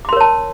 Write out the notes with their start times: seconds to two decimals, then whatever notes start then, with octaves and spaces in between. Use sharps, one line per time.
0.05 D6
0.09 C6
0.13 A#4
0.17 C#5
0.20 A5